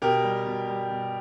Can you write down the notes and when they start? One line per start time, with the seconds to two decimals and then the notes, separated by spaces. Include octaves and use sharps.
0.02 B2 G4 A#4
0.24 G3
0.46 B2
0.69 G3
0.90 B2